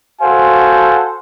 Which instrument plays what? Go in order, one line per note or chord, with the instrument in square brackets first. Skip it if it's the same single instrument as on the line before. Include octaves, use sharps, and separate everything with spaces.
[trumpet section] F#4 A4 C5 F5 F#5 G#5